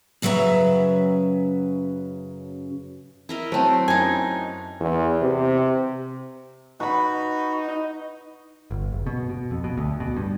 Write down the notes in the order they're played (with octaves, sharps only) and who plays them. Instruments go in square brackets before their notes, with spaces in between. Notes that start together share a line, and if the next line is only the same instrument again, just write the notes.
[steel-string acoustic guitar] F#2 C#3 F#3 B4 E5 A#5
[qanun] E4 A#4 D#5
[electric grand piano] F#3 [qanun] A3 C4 [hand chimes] C5 C#5 A5
[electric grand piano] F#2 [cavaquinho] D#4 G#5
[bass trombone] E2
C3
[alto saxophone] D#4 [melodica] F#4 [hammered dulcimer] B4 B5
[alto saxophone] D#4
[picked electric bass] G1
F#1
B2
B2
F2
B2
D2
B2
G2